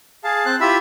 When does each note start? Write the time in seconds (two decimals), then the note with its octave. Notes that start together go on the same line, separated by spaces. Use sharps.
0.24 G#4 F5 A5
0.46 C4 C5 A5 F#6
0.61 E4 F4 G4 E5 B5 E6